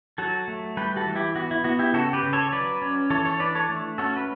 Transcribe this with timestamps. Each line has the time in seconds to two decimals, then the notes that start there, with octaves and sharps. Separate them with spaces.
0.18 F#3 F#4 A4
0.48 A3
0.77 G3 G4 B4
0.96 F#4 A4
1.07 E3
1.15 E4 G4
1.36 B3 F#4
1.51 E4
1.64 B3 F#4
1.79 E4 G4
1.93 C#3 F#4 A4
2.13 G4 B4
2.23 C#3
2.33 A4 C#5
2.52 F#3 B4 D5
2.82 C#4
3.10 E3 A4 C#5
3.25 A4 C#5
3.39 D4 B4 D5
3.55 A4 C#5
3.69 A3
3.98 C#4 F#4 A4
4.16 B4